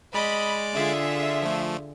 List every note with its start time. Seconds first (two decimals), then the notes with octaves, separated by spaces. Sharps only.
0.14 G#3 D5 D#5 B5 D6
0.74 D3 F4 G#4 E5
1.42 F3 A3